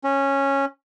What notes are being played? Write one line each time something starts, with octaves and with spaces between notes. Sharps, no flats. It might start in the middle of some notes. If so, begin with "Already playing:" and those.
C#4